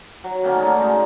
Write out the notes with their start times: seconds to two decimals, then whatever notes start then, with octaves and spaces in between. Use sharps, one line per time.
0.24 F#3
0.43 D3 D#3 A#3 C#4
0.59 A3 G#4 A#4
0.78 G#3 D#4